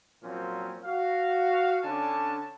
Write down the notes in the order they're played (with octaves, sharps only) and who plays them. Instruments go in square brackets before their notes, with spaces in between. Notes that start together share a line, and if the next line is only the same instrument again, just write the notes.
[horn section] A#2 F3 F#3 A#3 C4 C#4
F#4 F5
D3 C#4 D4 G#5 A5